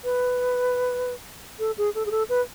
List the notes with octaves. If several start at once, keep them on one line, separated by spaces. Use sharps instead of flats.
B4
A4
G#4
A4
G#4
A4
B4